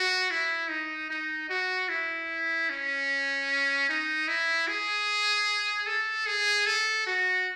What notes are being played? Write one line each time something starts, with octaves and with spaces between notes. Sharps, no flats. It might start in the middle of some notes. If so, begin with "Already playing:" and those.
Already playing: F#4
E4
D#4
D#4
F#4
E4
C#4
D#4
E4
G#4
A4
G#4
A4
F#4